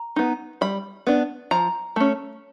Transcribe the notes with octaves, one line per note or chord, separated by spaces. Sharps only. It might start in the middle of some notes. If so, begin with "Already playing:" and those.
Already playing: A#5
B3 D#4
G3 B5
B3 D4
F3 A#5
A3 C#4